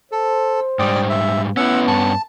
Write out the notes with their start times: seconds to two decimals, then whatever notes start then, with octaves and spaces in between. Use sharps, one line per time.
0.12 A4 C5
0.79 G#2 G3 D5 G5 D#6
1.10 E5
1.57 B3 C#4 E4 F#5 E6
1.87 G2 C#4 A5